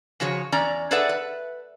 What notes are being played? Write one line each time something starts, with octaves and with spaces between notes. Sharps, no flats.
C#3 F3 F#4 G#4 C#5
E2 C#4 D5 A#5
G#4 A4 B4 D5 E5 F#5
B4